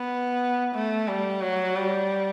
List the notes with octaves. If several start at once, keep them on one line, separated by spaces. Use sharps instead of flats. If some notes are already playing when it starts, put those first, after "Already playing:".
Already playing: B3
A3
G3
F#3
G3